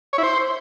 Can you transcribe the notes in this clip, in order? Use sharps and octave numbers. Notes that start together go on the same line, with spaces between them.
C#5
E4
C5